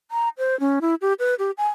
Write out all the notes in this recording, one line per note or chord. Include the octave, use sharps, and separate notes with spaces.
A#5
C5
C#4
E4
G4
B4
G4
G#5